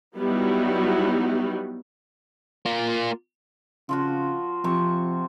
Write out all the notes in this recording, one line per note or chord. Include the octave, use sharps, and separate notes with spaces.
F#3 G3 B3 D#4 E4 F#4
A#3 F4
C#3 F3 F4 F#4
C3 F3 C#6